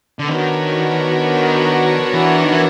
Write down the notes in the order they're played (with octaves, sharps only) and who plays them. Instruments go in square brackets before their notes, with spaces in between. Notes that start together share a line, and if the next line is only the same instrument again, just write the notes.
[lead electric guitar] D3
[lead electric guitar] D#3 [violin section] B3 D4 F#4 A#4 C#5
[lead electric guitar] E3
D#3
E3